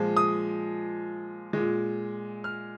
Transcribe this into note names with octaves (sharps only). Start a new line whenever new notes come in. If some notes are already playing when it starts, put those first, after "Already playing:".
Already playing: A#2 F3 G#3
D#6
A#2 G#3
F6